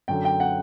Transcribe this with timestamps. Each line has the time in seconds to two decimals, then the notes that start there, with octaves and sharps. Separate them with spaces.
0.08 F#2 D3 F#3 G5
0.25 G5
0.40 F#5